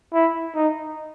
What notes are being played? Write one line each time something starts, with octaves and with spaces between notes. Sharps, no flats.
E4
D#4